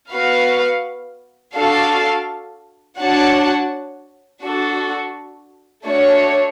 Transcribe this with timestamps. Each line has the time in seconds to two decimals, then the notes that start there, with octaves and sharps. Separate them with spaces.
0.12 B3 F#4 B4 F5
1.56 D4 F#4 A4 F5 A5
2.99 D4 F#4 C#5 F#5 A5
4.43 D4 F#4 A4
5.86 A3 D4 F#4 C#5